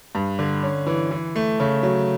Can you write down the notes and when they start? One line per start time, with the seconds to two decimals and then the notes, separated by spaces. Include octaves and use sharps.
0.15 G2
0.39 D3
0.63 C#4
0.86 E3
1.11 E3
1.36 A3
1.60 C#3
1.83 F#3